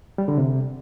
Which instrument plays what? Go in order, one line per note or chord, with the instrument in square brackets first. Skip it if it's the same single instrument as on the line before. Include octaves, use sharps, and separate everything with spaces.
[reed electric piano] G3
D3
C3